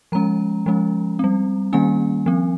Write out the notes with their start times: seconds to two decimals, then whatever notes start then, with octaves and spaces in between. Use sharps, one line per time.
0.12 F3 G#3 C#4 A#5
0.66 F3 G#3 C#4
1.19 G3 C4
1.73 D#3 G3 A#3 C#4 G#5
2.26 F3 C4